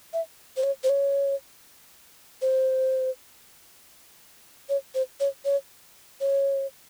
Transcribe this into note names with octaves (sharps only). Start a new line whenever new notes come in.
E5
C5
C#5
C5
C#5
C5
C#5
C5
C#5
C#5
C#5